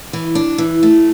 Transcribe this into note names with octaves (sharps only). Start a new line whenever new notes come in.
E3
D4
E3
A3